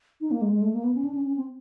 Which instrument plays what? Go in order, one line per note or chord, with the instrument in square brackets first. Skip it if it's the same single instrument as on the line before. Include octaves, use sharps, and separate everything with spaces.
[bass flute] D#4
A#3
G#3
G#3
A3
A#3
B3
C#4
D4
C#4
C#4
C4